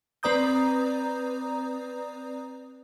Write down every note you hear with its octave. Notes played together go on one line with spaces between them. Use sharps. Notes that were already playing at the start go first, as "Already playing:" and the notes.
C4 B4 D5 A#5 D#6 G6